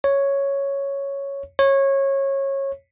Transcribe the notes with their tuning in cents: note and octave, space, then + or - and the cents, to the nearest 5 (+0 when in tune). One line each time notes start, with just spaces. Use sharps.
C#5 +0
C#5 -20